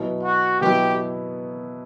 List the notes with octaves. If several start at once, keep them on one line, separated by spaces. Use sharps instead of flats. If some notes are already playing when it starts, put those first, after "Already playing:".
Already playing: B2 F#3 B3 E4
F#4
B2 F#3 B3 E4 G4